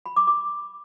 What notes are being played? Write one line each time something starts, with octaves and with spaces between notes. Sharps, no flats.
B5
D6
D6